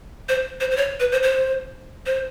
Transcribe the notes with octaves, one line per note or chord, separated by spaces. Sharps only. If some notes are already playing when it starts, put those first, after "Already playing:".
C5
C5
C5
C#5
B4
C5
C5
C5